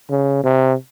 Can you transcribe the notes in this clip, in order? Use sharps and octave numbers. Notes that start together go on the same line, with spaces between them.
C#3
C3